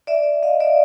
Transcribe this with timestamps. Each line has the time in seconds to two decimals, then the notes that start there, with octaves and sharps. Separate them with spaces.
0.07 D5 E5
0.43 D#5 F5
0.60 D5 E5